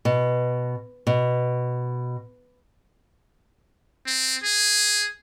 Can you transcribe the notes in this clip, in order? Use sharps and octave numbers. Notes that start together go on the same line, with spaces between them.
B2
B2
C4
G#4